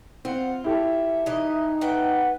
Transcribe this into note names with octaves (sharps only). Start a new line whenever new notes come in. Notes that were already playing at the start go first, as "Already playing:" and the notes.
C4 F4 F#5
E4 G4 A4 E5
E3 D#4 D#5
A3 B4 F#5 G5